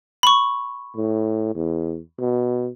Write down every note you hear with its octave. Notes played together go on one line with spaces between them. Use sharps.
B5 C#6
A2
E2
B2